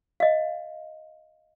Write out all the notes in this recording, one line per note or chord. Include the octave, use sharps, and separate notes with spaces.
D#5 F5